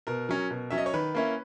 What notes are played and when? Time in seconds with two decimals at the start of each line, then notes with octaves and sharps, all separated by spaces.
0.07 B2 A#4
0.29 F#3 C#4
0.50 B2
0.70 F#3 C#4 E5
0.78 D#5
0.86 C#5
0.94 D#3 B4
1.15 A#3 C#4 E4